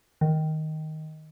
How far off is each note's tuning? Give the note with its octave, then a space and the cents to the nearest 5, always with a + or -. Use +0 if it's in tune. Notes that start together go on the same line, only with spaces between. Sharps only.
D#3 +5